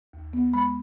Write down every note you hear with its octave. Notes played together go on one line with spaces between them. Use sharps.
D#2
B3
G#3 B5